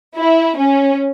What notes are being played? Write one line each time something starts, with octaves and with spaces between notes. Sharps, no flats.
E4
C#4